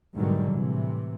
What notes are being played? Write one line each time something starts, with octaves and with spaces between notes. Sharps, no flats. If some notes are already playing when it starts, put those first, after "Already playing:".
G#2 B2 D3 D#3 F#3 G3
A2 C3 E3